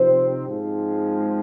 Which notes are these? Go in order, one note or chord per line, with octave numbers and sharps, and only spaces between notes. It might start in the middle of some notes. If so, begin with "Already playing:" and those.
Already playing: C3 F3 C4 D#4 C5
G#2 F3 G#3 C4